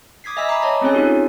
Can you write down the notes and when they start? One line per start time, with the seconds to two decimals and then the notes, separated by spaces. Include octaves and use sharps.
0.24 D6 D#6 G#6 B6 C7
0.37 D#5 E5 G#5 B5 E6 B6
0.49 A#5 B5 D6 E6 C7
0.62 C#5 D#5 A5
0.81 A3 C4 C#4 G#4 C#5 G#5
0.94 A3 C4 D#4 F4 G4 A4